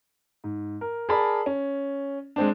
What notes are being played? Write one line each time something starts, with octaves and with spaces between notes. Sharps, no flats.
G#2
A#4
G#4 A#4 D5 A5 B5
C#4
G#3 C4 D4